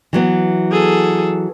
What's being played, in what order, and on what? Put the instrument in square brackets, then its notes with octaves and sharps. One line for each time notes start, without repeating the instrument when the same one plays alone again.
[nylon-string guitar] E3 F#3 B3
[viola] G#4 A4